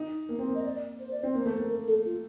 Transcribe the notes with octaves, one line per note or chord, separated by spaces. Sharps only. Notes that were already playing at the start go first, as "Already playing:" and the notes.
Already playing: D#4
A#3
C4
A#3
D#5
D5
C5
D5
C4 C5
A#3 C5
A3
C5
A#3
A#4
A4
F4